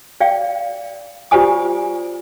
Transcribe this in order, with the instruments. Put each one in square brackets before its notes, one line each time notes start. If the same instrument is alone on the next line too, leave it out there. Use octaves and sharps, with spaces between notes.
[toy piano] D5 F5 G5
F4 G4 C5 D5 G#5 D#6